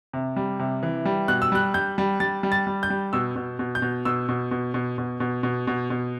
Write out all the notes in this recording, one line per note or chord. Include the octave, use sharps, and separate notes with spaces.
C3
G3
C3
E3
G3
B2 F#6
E6
G3 F#6
G3 G6
G3
G3 A6
G3
A6
G3
G6
G3
B2 E6
B2
B2
G6
B2
B2 E6
B2
B2
B2
B2
B2
B2
B2
B2